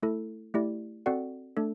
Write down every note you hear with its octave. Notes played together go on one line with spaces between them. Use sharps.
A3 E4 A4
A3 E4 G4 D5
C4 F#4 A4 D5 F#5
A3 D4 A4